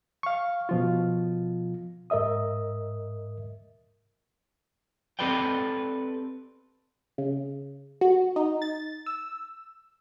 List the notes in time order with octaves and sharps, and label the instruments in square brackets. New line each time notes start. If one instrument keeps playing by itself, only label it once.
[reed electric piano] F5 C#6
B2 F3 F4
G#2 A#4 D#5 E5 D#6
[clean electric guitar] C4 G4 A4 B4 D5 G5
[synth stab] C#3
F#4
D#4
A6
E6